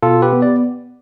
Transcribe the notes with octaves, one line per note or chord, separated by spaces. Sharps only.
B2 F4 A4
G4 B4
B3
D5